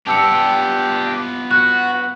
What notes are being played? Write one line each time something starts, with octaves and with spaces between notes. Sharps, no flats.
B3 D4 F4 G4 A5 E6 C#7
F#4 F#6